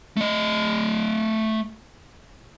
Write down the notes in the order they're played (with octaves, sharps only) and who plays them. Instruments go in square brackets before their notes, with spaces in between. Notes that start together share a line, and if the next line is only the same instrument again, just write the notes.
[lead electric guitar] A3 D#5